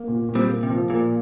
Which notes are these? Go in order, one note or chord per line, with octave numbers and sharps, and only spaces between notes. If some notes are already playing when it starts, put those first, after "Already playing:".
Already playing: A#3
A#2
A#2
G3 C4
A#3
C3
F3
A#2 A#4